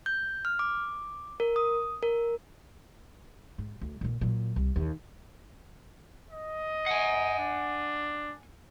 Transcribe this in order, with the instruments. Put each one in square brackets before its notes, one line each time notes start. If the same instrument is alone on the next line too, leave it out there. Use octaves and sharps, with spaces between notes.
[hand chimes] G6
F6
D6
A#4
D#6
A#4
[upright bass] G#2
D2
A#2 D3
A#2 F#3
C2
D#2 D3
[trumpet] D#5
[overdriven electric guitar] F#5 G#5
[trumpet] D4